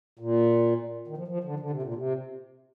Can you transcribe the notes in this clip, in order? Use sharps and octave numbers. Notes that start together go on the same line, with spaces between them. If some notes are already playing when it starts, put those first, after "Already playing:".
A#2
D#3
F3
F3
D3
D3
C3
A#2
C3